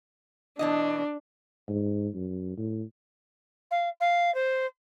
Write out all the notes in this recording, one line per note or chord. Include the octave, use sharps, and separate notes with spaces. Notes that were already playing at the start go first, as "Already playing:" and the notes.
B2 E3 D4 D#5
G#2
F#2
A2
F5
F5
C5